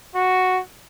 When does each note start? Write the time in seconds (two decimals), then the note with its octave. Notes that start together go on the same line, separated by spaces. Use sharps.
0.15 F#4